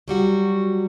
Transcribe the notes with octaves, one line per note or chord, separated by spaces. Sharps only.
F#3 G3 F#4